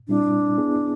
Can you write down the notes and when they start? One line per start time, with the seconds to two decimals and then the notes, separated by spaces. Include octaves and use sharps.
0.08 A#2 G3 C4 D4 E4
0.58 B3 E4 G#4